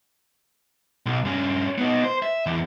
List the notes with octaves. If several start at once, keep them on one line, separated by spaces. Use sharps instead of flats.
B1
G2 C#4
B3 D#4
C5
E5
E2